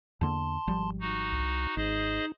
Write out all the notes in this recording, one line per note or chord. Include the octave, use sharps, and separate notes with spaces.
E2 D3 A#3 A5 C6
G#1 F3 G3
D#4 F#4
C2
G#1 D#4 G#4 C5 D#5